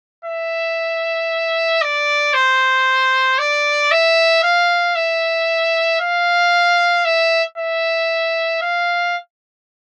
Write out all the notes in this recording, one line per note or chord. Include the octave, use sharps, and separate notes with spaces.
E5
D5
C5
D5
E5
F5
E5
F5
E5
E5
F5